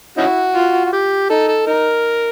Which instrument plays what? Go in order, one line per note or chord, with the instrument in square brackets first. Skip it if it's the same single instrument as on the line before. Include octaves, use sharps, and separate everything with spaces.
[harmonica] C#4 D#4 F#4 [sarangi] E4
[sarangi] F4
[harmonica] F#4
G4
[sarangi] D#4 [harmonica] A4
[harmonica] A4
[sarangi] D#4 [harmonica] A#4